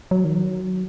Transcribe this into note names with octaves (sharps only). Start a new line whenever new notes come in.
F#3
D#3
F#3